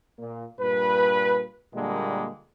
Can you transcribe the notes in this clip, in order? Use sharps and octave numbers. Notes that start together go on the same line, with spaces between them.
A#2
G2 A#2 B4
A#2 D3 G3 G#3 A#3